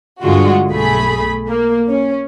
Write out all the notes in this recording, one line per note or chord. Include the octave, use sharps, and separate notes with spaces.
G2 D3 G#3 F4 F#4
B1 A3 G#4 B5
A#3
C#4